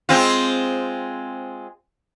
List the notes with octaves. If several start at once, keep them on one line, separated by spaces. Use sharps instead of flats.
G#3 C4 F4